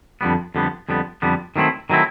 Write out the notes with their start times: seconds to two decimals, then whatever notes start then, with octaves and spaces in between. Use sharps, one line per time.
0.21 F2 D3 G3 B3
0.55 F2 D3 G3 B3
0.89 F2 D3 G3 B3
1.22 F2 D3 G3 B3
1.56 D#3 F#3 A3 C4 E4
1.90 D#3 F#3 A3 C4 E4